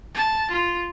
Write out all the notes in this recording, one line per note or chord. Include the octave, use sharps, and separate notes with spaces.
A5
F4